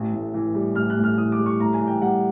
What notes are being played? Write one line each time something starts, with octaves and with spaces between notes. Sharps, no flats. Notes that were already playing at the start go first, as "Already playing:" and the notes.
Already playing: A1
A2
E3
G3
A1 F6
F#6
A2
F6
E3 D#6
D6
G3
C#6
A2 A#5
G#5
E3
G5
G3 F#5